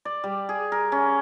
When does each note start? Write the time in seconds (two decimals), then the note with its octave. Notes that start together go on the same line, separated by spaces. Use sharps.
0.05 D5
0.24 G3
0.49 G#4
0.72 A#4
0.92 C#4